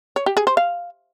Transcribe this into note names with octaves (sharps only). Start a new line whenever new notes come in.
C#5
G4
G#4
C5
F5